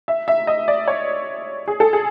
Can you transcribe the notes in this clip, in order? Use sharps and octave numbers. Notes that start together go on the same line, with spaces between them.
E5
E5
D#5
D5
C#5
G#4
A4
G#4